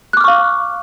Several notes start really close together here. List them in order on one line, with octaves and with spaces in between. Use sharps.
F#6 D6 F6 C#6 F5